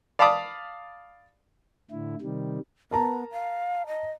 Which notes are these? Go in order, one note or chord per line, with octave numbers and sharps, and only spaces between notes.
D5 F5 A5 B5 D6 D#6
A2 D3 E4
C3 D#3 G3
B3 A#4 A5 A#5
F5
D#5